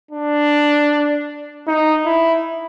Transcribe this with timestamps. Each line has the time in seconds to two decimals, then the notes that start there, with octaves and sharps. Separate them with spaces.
0.11 D4
1.67 D#4
2.06 E4